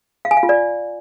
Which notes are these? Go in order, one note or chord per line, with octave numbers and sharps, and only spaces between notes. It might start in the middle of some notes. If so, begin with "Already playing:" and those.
F5
G#5
F5
F4
D5